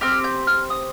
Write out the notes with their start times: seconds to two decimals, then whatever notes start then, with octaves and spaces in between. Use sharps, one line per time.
0.01 C4 G4 F6
0.24 G6
0.47 F6
0.70 D#6